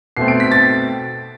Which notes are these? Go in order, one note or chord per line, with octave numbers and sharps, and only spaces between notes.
B2 A3 C4 C7
D7
B6
A6